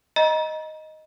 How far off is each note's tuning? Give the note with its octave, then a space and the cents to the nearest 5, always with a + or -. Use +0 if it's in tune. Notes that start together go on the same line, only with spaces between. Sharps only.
D#5 +0 A#5 +35